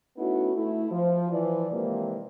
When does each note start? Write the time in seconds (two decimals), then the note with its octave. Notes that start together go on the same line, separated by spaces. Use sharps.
0.18 A3 B3 C#4 D#4 E4 F#4
0.55 A3 E4
0.91 F3
1.30 E3 F3 D5
1.71 C3 E3 F3 G#3 A#3